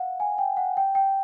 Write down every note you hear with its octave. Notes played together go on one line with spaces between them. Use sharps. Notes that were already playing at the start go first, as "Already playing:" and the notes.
Already playing: F5 F#5
G#5
G5
F#5
G5
G5